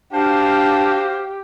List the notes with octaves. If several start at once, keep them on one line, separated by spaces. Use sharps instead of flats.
D4 F#4 G4 C5 F5